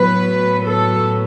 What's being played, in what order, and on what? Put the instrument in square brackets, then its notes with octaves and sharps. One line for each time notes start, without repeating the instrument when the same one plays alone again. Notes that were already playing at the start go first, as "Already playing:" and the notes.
Already playing: [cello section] A2 F#3 B3 B4
A4